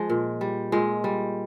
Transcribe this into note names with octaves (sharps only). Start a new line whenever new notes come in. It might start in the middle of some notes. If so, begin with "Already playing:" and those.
Already playing: F3 G#3
A#2
G3
A#2 G#3
G3